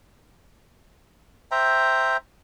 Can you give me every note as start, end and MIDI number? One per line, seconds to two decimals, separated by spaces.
1.51 2.17 72
1.51 2.17 76
1.51 2.17 79
1.51 2.17 82